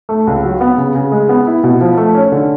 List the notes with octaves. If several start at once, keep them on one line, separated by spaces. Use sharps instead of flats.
A3
C#2
F#3
B3
C#3
C#3
G#3
B3
E4
B2
F3
A3
C#4
D3